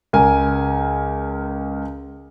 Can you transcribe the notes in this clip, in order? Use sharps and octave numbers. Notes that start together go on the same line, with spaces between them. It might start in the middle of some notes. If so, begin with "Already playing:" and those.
C#2 A#4 G#5